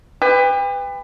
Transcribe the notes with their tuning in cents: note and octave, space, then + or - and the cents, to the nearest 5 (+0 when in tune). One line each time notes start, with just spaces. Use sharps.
G4 +35 B4 +20